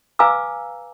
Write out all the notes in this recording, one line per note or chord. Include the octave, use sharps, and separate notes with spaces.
B4 F5 G#5 A#5 D6 E6